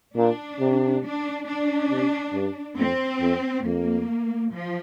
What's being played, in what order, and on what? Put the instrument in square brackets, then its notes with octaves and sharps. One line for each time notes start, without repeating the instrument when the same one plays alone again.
[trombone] A#2 [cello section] D4
[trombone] C3
[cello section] D4
D4
[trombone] C3
G2
[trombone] F2 [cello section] C4
[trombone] F2
[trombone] F2 [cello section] A#3
[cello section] F3